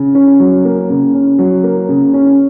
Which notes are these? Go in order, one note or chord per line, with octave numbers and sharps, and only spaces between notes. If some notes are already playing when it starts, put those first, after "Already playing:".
Already playing: C#3
C#4
F#3
A#3
C#3
C#4
F#3
A#3
C#3
C#4